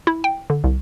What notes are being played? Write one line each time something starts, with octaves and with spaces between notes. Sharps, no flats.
E4
G5
D3
C2